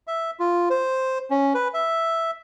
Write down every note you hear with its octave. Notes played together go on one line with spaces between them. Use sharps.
E5
F4
C5
C#4
B4
E5